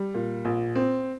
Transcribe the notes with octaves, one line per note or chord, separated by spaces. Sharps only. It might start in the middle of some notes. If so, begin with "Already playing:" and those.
Already playing: G3
A#2
A#1
C4